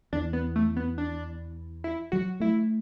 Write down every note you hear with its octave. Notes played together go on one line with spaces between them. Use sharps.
E2 D4
B3
A3
B3
D4
E4
F#3 F#4
A3 E4